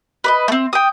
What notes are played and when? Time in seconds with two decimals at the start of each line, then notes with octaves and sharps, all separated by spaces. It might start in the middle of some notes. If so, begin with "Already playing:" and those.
0.24 B4 D5 D#5
0.48 A3 C4
0.73 G5 D#6